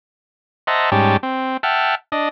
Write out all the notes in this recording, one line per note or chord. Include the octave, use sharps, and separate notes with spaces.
C5 D#5 E5 F#5 A5 A#5
G#2 G3 C#4 G4 A5
C4
E5 F#5 G5 A5 F6
D4 D#5